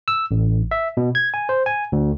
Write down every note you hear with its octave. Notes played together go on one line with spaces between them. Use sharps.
E6
A1
E5
B2
G#6
G#5
C5
G#5
D2